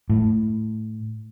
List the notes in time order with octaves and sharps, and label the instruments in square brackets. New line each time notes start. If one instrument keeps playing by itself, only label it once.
[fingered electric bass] A2